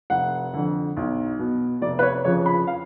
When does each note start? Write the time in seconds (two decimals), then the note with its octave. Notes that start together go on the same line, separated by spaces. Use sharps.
0.10 F1 F#5
0.54 F2 D3
0.97 B1
1.39 B2
1.81 F1 D5
1.99 B4
2.03 C#5
2.25 F2 C#3 F3 C#5
2.46 B5
2.67 F5